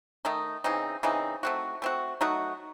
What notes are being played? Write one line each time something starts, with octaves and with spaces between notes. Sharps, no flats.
D#3 A3 D#4
C#3 E3 C4 D#4
C#3 E3 C4 D#4
A3 C4 F#4
A3 C4 F#4
F#3 A3 D#4 F#4